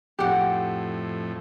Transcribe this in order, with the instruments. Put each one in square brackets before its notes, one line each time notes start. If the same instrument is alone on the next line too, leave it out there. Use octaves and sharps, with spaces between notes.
[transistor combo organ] F2 A2 [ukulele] G4 F#5